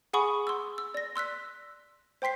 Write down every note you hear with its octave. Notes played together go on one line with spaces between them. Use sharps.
G#4 F#5 G#5 B5 C#6 D#6
C6 E6
E6
D5 A#6
C6 E6 F#6 B6
C5 G5 C6 B6 C7